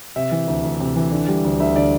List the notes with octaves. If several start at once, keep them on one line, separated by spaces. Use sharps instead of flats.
C3 E5
E3
D2
D2
C3
E3
D3
G3
D2
D2 E5
D3 D5